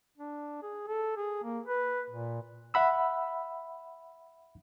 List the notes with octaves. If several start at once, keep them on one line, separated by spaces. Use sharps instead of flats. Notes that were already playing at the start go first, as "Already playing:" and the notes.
D4
G#4
A4
G#4
A#3
B4
A#2
E5 F#5 B5 E6